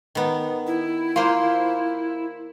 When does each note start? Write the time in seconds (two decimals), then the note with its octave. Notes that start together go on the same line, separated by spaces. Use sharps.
0.15 D#3 B3
0.67 E4
1.16 A#3 F4 C5